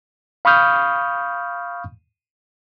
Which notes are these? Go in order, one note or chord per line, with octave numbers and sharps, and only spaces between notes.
F5 B5 C#6 D#6 F6 G6